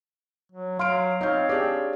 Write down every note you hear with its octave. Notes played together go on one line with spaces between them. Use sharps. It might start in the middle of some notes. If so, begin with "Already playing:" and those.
F#3
F#3 F5 C6 F6 D7
C4 D#4 C#5 F5 G6
D4 G4 G#4